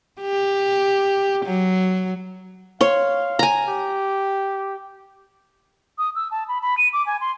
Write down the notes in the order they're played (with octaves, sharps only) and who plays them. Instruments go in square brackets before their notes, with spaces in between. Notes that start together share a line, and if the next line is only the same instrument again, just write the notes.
[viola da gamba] G4
F#3
[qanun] C#5 C6 [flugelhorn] F5
[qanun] G#5 A#5
[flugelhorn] G4
[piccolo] D#6
E6
A5
B5
B5
D#7
D6
G#5
C6